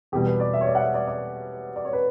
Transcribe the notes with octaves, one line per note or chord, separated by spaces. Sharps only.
E2 B2 G3 G4
B4
D5
E5
C#5
D5
F#5
E5
D5
D5
D5
C#5
B4